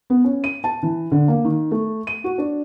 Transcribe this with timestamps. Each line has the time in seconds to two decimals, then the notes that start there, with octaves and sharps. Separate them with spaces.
0.10 B3
0.24 C#4
0.44 D#7
0.64 A5
0.83 E3
1.11 D3
1.28 A#3
1.45 D#3
1.71 A3
2.07 D#7
2.24 F#4
2.38 D4